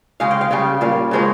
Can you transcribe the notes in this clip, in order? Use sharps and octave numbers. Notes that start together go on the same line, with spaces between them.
C#3 G#3 C#4 F5
G5
F5
C#3 G3 C#4
A#2 G3 C#4 F5
C#3 F3 G#3 C#4